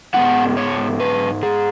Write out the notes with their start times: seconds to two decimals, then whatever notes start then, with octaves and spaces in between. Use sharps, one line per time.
0.14 G#2 G#3 B3 E4 F#5
0.57 C#5
1.00 B4
1.43 G#4